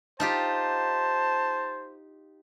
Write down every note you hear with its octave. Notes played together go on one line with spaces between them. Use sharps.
D#4 F4 G4 C5 A5